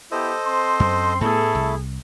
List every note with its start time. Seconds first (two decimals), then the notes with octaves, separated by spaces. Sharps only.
0.12 B3 E4 G4 A4 C5 D#5
0.45 C4 C6
0.80 F#2
1.21 A2 A3 B3 E4 G#4 A4
1.55 C2